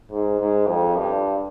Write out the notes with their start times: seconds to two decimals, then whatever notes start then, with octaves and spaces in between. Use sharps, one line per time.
0.11 G#2
0.40 G#2
0.68 F2
0.96 G2